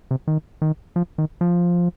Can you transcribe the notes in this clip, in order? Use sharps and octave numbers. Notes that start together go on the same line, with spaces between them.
C3
D#3
D#3
F3
D#3
F3